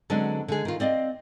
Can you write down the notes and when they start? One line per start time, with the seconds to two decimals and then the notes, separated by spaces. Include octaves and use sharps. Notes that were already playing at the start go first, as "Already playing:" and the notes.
0.10 D3 F#3 G#3 B3 C4 D4
0.48 D3 G#3 G#4
0.65 D#3 F4
0.80 C4 D5 D#5 F5